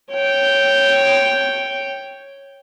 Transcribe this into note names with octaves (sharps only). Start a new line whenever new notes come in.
C#5 G5